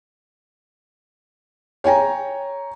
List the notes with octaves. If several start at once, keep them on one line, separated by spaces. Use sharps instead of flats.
C#5 G5 G#5 A#5